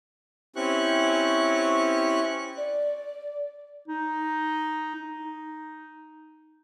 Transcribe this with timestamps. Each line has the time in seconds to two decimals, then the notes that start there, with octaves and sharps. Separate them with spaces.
0.56 C4 C#4 E4 G4 C#6 F#6
2.57 D5
3.88 D#4
4.95 D#4